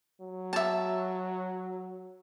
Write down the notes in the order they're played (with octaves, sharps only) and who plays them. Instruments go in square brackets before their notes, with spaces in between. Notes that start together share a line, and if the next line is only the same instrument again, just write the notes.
[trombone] F#3
[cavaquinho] E5 A5